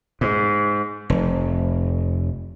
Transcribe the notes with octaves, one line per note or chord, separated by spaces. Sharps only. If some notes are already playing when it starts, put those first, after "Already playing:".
G#2
F1